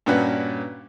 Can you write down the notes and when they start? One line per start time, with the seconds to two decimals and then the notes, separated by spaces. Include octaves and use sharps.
0.06 G2 A#2 C#4 D4 F#4 B4